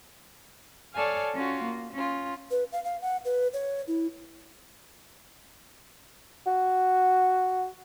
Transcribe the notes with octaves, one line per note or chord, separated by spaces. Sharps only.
A4 C#5 D5 F5 G#5 A5
C#4 F4 F#4
A#3
C#4 F4
B4
F5
F5
F#5
B4
C#5
E4
F#4